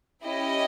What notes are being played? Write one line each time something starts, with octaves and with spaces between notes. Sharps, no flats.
C#4 E4 G4 D#5